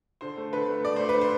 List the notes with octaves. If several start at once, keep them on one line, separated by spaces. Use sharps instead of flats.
D3 C5
A3
D3 B4
A3
A3 D5
A3 C5
B4
D3
C5